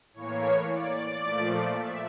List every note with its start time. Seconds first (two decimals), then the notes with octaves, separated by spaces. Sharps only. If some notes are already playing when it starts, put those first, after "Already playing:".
0.14 A2 E3 A#3 C#5
0.67 D5
1.22 A#2 F3 A3
1.76 E5